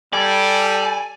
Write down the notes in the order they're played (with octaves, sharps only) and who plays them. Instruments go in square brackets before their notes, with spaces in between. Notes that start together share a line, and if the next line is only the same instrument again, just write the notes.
[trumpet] G3 [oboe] A4 [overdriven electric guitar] D5 [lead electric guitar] G#5